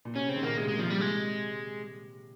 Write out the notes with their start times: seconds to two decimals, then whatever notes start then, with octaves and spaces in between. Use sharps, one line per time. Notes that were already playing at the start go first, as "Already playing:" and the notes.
0.05 A#2
0.15 C3 C#4
0.26 C#3
0.29 C4
0.36 D#3
0.43 A#2 A#3
0.57 C3 G#3
0.68 C3 G#3
0.79 F3
0.87 A#2
0.90 G3
1.01 C3 G#3